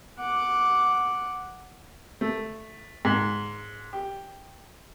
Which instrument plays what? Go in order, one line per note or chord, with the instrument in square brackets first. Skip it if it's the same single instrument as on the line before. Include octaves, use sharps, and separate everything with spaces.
[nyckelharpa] F#5 D6
[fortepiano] A3
G#2
G4